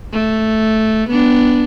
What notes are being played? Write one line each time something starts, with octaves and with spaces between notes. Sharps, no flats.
A3
B3 D4